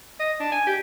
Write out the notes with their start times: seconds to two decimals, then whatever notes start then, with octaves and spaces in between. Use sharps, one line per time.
0.20 D#5
0.40 D4
0.52 G#5
0.67 G4